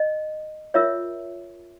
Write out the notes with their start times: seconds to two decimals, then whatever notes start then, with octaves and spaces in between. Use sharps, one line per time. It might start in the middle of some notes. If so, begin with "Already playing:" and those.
Already playing: D#5
0.74 F4 A#4 C#5 E5